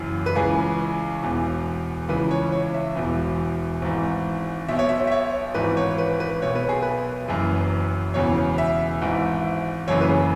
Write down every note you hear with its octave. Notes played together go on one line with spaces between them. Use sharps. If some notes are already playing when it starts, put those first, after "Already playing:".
Already playing: F#1 F#2 C#3 E3
B4
C#2 C#3 E3 G#4
E1 E2 E3
C#2 C#3 E3 B4
C#5
C#5
E5
E1 E2 E3
G#1 G#2 E3
B1 B2 E5
C#5
E5
E5
C#5
G#1 G#2 E3 B4
C#5
B4
B4
B1 B2 C#5
B4
G#4
B4
F#1 F#2 E3
E1 E2 C#3 E3 C#5
E5
G#1 G#2 E3
F#1 F#2 C#3 E3 C#5
B4
G#4